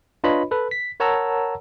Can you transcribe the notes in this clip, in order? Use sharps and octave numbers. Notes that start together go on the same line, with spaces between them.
D4 F4 B4 C#5 D#5 B5
A4 B4
B6
A#4 C#5 F#5 A5 A#5 E6